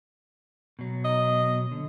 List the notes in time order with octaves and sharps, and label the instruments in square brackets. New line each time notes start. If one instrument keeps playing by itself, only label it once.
[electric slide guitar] B2 F#3
[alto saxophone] D#5
[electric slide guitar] D3